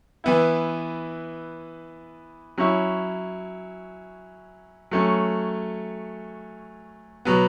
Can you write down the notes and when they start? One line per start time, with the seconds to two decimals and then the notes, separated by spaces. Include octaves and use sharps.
0.24 E3 B3 E4
2.58 F#3 C#4 E4
4.91 F#3 A3 C#4
7.25 B2 F#3 B3